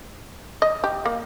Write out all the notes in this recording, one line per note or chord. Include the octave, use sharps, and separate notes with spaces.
D#5
G4
A#3